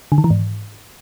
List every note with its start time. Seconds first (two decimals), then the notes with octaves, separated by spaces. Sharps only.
0.12 D3
0.18 D#3
0.24 E3
0.30 G#2